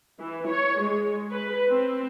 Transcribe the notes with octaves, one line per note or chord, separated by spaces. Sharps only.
E3
C#5
G#3
B4
C4